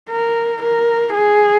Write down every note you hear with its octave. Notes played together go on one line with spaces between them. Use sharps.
A#4
A#4
G#4